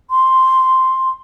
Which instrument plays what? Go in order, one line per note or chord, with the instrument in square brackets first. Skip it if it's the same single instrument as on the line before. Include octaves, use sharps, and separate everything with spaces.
[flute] C6